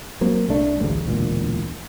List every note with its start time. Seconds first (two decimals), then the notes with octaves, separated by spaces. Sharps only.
0.21 F#3 A#3 C4
0.48 C2 A3 D4
0.80 A1 D2 G2 C#3
1.06 E1 D2 A#2